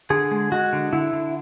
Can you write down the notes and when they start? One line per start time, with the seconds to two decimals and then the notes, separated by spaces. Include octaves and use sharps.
0.10 D3 G#4
0.31 G#3
0.52 G#3 F#4
0.73 D3
0.93 D3 E4
1.13 D3